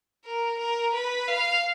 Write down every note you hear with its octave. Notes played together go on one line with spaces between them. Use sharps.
A#4
A#4
B4
F5